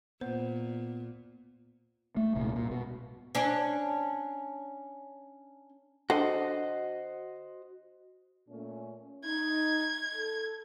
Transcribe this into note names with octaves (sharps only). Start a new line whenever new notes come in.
A#2 B3 C5
A3
D#1 C2 A#2
A#2
B2
C#4 D4
D3 F#4 C5 D#5
A#2 A3 C#4
D#4 G#6
A4